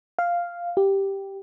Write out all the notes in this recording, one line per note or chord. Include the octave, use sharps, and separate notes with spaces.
F5
G4